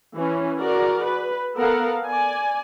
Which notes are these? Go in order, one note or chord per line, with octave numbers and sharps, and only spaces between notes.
E3 C#4
F#4 G#4 A#4 D5
B4
B3 A4 A#4 F5 F#5
D5 G#5